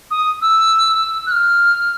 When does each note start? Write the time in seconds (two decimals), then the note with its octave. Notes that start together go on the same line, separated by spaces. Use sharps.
0.10 D#6
0.41 E6
1.26 F#6
1.31 F6